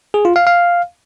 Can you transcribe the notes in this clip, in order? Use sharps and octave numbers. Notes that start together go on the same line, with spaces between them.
G#4
F4
F5
F5